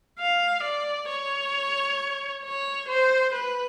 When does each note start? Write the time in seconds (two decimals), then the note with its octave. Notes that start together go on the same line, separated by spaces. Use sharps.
0.19 F5
0.63 D5
1.09 C#5
2.43 C#5
2.88 C5
3.34 B4